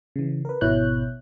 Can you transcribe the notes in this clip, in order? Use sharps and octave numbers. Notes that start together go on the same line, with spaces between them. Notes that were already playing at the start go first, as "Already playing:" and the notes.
C#3 E3
A#4 B4
G#1 B2 E4 C#5 F#6 G6